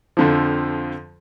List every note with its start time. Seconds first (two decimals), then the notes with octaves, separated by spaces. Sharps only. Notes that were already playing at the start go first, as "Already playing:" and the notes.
0.17 F2 D3 F3